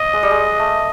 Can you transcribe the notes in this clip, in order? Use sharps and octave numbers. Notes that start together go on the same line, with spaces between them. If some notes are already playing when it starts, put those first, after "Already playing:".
Already playing: D#5
G#3
G3
G#3
A3